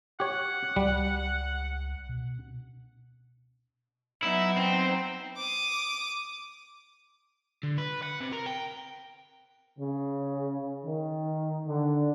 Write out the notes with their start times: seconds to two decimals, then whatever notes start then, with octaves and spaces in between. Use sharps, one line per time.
0.20 G4 C#5 F#5
0.76 C#2 G3
2.09 B2
4.23 F#3 B3 D#4 E4
4.57 C4
5.37 D6 D#6
7.63 D3
7.78 B4
8.02 F#5
8.20 C3
8.33 A#4
8.46 G5
9.79 C#3
10.84 D#3
11.67 D3